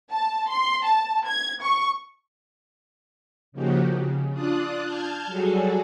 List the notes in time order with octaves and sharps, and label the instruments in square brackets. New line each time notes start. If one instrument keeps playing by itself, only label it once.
[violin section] A5
C6
A5
G#6
C#6
[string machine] C#3 F3 A#3 D#4 F#4 G4
C#3
D4 F4 D5 D#6 F#6
A5 F6 G6 G#6
F#3 G3 F#4 G#4 A4